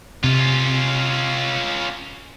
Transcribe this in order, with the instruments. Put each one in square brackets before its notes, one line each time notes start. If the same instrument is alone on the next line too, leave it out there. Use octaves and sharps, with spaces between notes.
[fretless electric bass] C3 [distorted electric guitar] C#4 F4